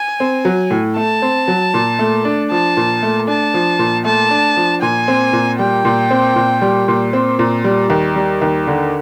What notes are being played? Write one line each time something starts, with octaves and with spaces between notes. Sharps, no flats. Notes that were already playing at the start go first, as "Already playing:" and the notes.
Already playing: G#5
C4
F#3
A2
A3 A5
C4
F#3
A#2
A3
D4
F3 A5
A#2
A3
D4 A5
F3
A#2
A3 A5
D4
F3
A#2 G#5
C4
A#2
G3 G5
A#2
C4
A#2
G3
A#2
C4
A#2
G3
D#2
G3
D#2
D3